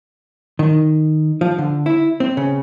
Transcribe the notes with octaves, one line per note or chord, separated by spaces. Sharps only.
D#3
F3
D3
E4
C4
C#3